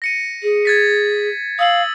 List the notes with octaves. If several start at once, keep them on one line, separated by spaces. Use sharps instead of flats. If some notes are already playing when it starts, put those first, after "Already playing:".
A#6 C#7 D#7
G#4
G#6 A6 B6
F5 D#6 E6 F#7